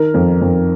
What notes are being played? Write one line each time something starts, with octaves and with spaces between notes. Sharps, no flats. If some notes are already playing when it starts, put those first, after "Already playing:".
Already playing: D#3 A#4
F2
F2